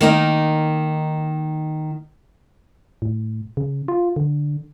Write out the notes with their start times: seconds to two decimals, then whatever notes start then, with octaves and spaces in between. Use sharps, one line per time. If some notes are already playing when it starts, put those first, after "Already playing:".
0.01 D#3 A#3 D#4
3.02 A2
3.57 C#3
3.88 F4
4.16 D3